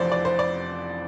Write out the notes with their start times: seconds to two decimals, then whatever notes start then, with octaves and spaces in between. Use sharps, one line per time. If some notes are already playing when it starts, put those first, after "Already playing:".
Already playing: F1 F2 E3 C5 D5
0.12 D5
0.25 C5
0.39 D5